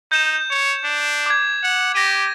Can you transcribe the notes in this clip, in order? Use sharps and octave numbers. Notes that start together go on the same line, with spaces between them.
D#4 G6 E7
C#5
D4
D6 G#6
F#5
G4 A#6 D#7